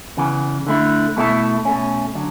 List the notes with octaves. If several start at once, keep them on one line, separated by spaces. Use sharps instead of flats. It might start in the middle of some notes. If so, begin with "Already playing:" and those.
E2 C#3 E3
D3 A3 E4
B2 A3 E4 A4
B2 A3 C#4
D3 F#3